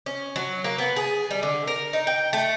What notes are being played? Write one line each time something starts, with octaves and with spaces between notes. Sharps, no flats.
C#4
F#3
A#3
B3
G#4
G3
D3
A#4
D#4
G5
A3